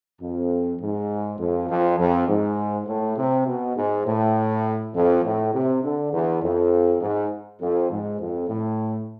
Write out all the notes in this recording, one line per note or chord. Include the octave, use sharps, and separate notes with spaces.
F2
G#2
F2
F2
F2
G#2
A2
C3
B2
G#2
A2
F2
A2
C3
D3
E2
F2
G#2
F2
G#2
F2
A2